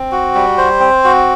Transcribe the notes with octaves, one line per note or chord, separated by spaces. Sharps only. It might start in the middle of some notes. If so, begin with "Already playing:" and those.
Already playing: C4
F#4
G3
C5
C4
F#4